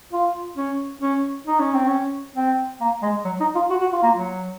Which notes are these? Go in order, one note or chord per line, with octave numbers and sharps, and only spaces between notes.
F4
C#4
C#4
D#4
C#4
C4
C#4
C4
A#3
G#3
F#3
D#4
F4
F#4
F#4
F4
A#3
F#3